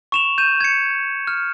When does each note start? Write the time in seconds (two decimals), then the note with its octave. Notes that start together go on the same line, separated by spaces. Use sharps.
0.12 C#6 E7 F7
0.38 G6 D#7 E7
0.61 G#6 C#7
1.27 F6